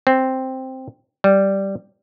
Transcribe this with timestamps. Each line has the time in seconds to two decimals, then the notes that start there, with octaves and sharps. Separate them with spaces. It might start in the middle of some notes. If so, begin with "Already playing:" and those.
0.07 C4
1.24 G3